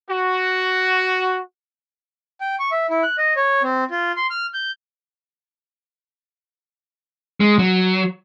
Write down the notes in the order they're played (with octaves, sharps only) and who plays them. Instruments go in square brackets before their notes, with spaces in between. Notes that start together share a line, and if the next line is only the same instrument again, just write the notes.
[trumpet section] F#4
[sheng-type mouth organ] G5
C#6
E5
E4
F#6
D#5
C#5
C4
F4
C6
F6
G6
[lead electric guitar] G#3
F#3